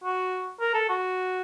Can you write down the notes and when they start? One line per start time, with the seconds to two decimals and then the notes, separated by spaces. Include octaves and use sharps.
0.04 F#4
0.60 A#4
0.74 A4
0.89 F#4